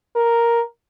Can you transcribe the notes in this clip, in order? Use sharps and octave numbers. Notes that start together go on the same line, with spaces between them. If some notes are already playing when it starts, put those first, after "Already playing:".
A#4